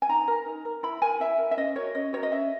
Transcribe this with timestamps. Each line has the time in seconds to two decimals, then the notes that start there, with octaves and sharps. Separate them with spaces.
0.02 G#5
0.09 D#4 A#5
0.28 A#4
0.46 D#4
0.65 A#4
0.83 E4 B5
1.02 A#4 G#5
1.20 E4 E5
1.38 A#4
1.51 E5
1.57 C#4 D#5
1.76 F#4 A#4 C#5
1.94 C#4 D#5
2.13 F#4 C#5
2.17 A#4
2.23 D#5
2.32 C#4 E5